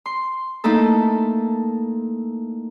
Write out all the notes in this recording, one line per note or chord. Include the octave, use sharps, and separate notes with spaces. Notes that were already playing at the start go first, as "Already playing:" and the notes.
C6
A3 A#3 D#4 E4 A4